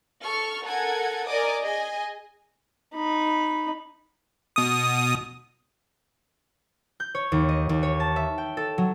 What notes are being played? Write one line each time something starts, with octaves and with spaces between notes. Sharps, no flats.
A4 C#6 F6
A4 A#4 F#5 G#5 G#6
A#4 D5 D#5 G#5 D6 D#6
G#4 D#5 G#5
D#4 B5
B2 D#6
G6
C#5
D#2
D#5
D#2
C#5
A5
E5
G5
A4
F#3